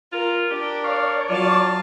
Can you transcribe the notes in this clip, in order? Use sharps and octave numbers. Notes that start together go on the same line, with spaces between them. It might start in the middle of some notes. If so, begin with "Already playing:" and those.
F4 A#4
D4 G4 A#4
C#5 D5 F5
F#3 F4 F5 A5